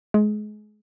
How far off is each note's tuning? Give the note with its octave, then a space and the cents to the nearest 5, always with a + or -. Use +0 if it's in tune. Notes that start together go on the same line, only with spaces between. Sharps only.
G#3 +30